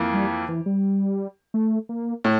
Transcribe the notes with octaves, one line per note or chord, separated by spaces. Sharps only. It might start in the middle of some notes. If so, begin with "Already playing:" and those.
Already playing: F2 E3 A#3
G3
E3
G3
A3
A#3
A2 A3